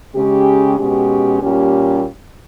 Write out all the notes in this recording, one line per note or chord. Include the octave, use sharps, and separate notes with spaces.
C#3 G#3 C#4 G4
B2 G#3 C#4 G4
A#2 G3 A#3 C#4 G4